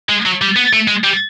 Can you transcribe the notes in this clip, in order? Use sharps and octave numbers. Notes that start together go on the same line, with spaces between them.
G#3
F#3
G3
B3
A3
G#3
G3